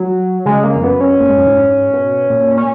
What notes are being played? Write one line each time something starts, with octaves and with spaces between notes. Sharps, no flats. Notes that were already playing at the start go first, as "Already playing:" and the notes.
Already playing: F#3
C#3 G#3
A#3
F2
F#2 B3
C#4
A#2
G#2
F#2
G#2
G#2
B2
A#2
C#4